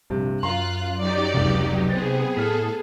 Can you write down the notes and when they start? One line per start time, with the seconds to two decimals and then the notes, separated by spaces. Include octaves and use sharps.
0.10 A#1 G2 C3
0.43 F#2 F4 F5 A#5 C6 F#6
0.99 F#3 D#4 G4 D5
1.34 F1 C#2
1.90 C3 B3 C4 G#4 A6
2.37 A2 A4 F6 B6